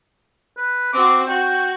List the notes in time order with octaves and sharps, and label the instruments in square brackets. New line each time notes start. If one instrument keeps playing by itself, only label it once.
[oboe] B4
[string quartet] C4 F#4 [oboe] D6
[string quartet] F#4 [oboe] G5